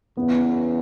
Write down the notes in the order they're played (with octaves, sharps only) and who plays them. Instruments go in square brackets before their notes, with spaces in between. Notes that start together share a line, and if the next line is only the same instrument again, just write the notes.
[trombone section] E2 C#3 E3 [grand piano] B3